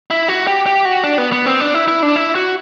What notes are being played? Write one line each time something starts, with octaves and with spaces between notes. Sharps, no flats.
E4
F#4
G4
G4
F#4
D4
B3
B3
C4
D4
E4
E4
D4
E4
F#4